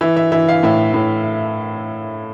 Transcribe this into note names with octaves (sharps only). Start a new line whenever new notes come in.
E3 E5
E5
E3 E5
F5
A2 E5
A2